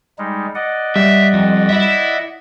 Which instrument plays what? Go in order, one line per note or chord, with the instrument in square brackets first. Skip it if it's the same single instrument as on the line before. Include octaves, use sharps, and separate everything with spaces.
[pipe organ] G3 G#3 D#4
D5 D#5 F#5
[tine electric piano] G3 [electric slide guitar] E5
[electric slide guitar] F2
E4 E5